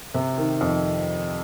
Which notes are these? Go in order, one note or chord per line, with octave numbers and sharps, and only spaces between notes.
C3
D#3
F2